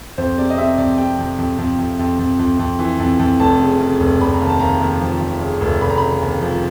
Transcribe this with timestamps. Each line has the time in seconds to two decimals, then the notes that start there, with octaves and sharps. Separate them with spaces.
0.18 F2 C5
0.38 C3 D5
0.50 D#5
0.58 C3 E5
0.78 F2 D5
0.98 C3 G5
1.18 F2
1.38 F2
1.58 F2
1.78 F2
1.99 F2
2.19 F2
2.39 F2
2.59 F2
2.79 E3
2.99 F2
3.19 F2
3.40 F1 A5
3.60 C#3
3.80 C#3
4.00 F1
4.20 F1 B5
4.33 A#5
4.41 D#2
4.46 A5
4.59 D#2 A#5
4.81 D#2
5.01 F3
5.20 F3
5.41 C#3
5.61 F1
5.81 F1 B5
5.89 A#5
5.98 C#3 B5
6.22 D#2
6.42 F3